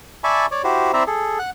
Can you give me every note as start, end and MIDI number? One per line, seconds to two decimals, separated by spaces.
0.24 0.46 74
0.24 0.46 76
0.24 0.46 80
0.24 0.46 81
0.24 0.46 83
0.24 0.46 85
0.51 0.62 73
0.51 0.62 74
0.51 0.62 86
0.64 0.92 64
0.64 0.92 66
0.64 0.92 67
0.64 0.92 72
0.94 1.03 60
0.94 1.03 64
0.94 1.03 72
0.94 1.03 74
0.94 1.03 76
0.94 1.03 82
1.07 1.38 68
1.07 1.38 69
1.39 1.50 78
1.39 1.50 90